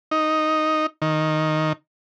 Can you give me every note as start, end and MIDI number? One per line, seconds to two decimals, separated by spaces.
0.11 0.86 63
1.02 1.73 51